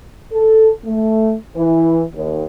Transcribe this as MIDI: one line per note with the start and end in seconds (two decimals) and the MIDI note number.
0.34 0.69 69
0.85 1.35 57
1.56 2.03 52
2.14 2.45 39